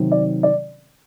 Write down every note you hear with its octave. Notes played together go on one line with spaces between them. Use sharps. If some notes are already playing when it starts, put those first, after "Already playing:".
Already playing: C3 D#3 F#3 C4
D5
D5